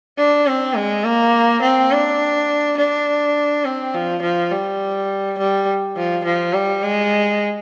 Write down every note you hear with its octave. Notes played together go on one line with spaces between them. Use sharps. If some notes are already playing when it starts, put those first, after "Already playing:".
D4
C4
G#3
A#3
C4
D4
D4
C4
F3
F3
G3
G3
F3
F3
G3
G#3